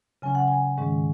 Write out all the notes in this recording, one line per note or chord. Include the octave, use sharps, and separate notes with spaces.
C#3 F#3 C#4 G#5
F#5
G#5
G#2 D#3 G#3 C#4